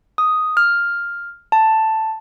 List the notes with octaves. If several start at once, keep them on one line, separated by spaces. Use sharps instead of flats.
D#6
F6
A5